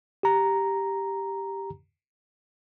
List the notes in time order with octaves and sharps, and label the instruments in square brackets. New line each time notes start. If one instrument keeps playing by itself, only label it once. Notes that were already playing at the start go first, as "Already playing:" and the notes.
[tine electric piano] G4 A#5